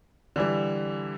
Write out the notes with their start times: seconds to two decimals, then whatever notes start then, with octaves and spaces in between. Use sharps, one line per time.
0.36 D3 E3 G3